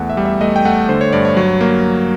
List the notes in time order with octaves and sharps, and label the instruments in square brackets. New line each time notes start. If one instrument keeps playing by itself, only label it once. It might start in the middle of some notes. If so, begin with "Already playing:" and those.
Already playing: [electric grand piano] E2 A3 F#5
E5
G3
E5
A3 D#5
G5
A3 F#5
D3 C5
C#5
G2 D5
C#5
F#3
A#3